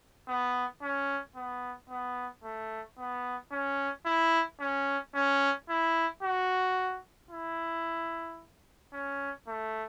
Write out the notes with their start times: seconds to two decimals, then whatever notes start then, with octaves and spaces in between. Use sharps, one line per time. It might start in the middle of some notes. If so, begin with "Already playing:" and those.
0.28 B3
0.82 C#4
1.36 B3
1.90 B3
2.44 A3
2.98 B3
3.52 C#4
4.06 E4
4.60 C#4
5.14 C#4
5.69 E4
6.23 F#4
7.31 E4
8.93 C#4
9.48 A3